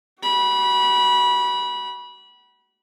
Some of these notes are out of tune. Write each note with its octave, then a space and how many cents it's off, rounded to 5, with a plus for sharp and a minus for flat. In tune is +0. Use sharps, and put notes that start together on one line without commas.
F#4 +35 B5 -25